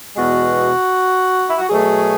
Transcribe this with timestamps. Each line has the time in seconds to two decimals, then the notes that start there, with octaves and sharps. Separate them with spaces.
0.16 E2 B2 G#3 B3 F#4
1.47 E4
1.58 F#4
1.69 B2 F#3 A3 G#4